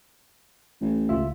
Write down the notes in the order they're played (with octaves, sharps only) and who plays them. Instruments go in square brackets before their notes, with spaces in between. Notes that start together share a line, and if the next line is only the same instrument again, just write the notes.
[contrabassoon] A1
[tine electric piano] C#2 F4 E5